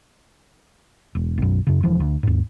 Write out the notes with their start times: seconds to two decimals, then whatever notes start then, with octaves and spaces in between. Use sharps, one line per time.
1.15 E1
1.38 B1 F#2
1.67 F#2 C#3
1.83 E1 E3 F3
2.00 D2
2.23 D#2 G#2